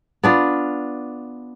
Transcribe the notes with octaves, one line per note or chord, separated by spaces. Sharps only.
B3 D4 F4